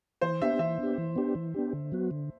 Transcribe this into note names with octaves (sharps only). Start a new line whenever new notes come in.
E3 C5
B3 D4 G4 E5
E3 E5
B3 D4 G4
E3
B3 D4 G4
E3
B3 D4 G4
D3
F#3 B3 F#4
D3